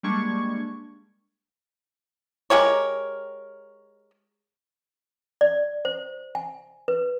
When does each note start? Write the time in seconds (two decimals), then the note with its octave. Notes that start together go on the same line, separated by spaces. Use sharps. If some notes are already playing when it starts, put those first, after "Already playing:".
0.03 G3 G#3 A#3 D4 C#6 G#6
2.50 G#3 G4 A#4 C#5
5.41 D5
5.85 C5
6.35 G#5
6.88 B4